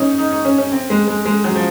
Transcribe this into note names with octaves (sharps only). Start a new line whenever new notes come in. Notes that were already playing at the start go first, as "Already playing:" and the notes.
Already playing: C#4 D#4
D#4
D#4
C#4
C#4
C4
G#3
G#3
G#3
F#3
F3